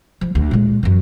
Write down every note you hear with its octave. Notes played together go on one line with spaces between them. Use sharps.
F3
D2
A#2 G#3
F#2 E3